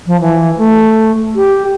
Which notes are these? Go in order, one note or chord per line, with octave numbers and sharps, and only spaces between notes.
F3
E3
A3
G4